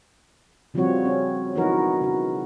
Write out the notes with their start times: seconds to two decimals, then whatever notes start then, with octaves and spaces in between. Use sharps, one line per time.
0.74 C#3 F3 G3 C4 F#4 C#5
1.05 C#4
1.55 E3 F#3 B3 D#4 F#4 A#4
2.01 C#3 F#4